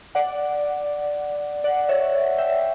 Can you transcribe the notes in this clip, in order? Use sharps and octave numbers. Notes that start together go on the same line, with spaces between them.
D5 F#5
D5 F#5
C#5 E5
E5 G5